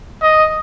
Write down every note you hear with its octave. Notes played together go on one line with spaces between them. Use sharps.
D#5